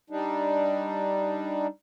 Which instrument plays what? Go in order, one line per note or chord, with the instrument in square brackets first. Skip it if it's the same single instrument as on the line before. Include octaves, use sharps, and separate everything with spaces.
[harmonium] G3 D4 D#4